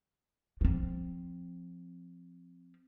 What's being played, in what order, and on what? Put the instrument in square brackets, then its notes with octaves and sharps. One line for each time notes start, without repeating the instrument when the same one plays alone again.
[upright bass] F3 C4